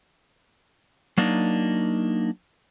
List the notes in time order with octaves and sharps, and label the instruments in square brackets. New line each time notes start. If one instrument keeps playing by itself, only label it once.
[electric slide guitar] F#3 A#3 D4 D#4